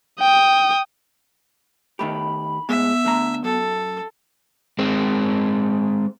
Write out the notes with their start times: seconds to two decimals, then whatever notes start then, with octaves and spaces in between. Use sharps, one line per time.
0.20 G5 D#6
1.99 D#3 A3 G4 B5
2.69 A2 G#3 B3 E5
3.05 D3 A3 A#5
3.44 F#2 A4
4.79 G#3 C4